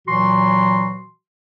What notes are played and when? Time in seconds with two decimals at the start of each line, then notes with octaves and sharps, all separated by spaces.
0.07 A#2 E3 F#3 F#4 C6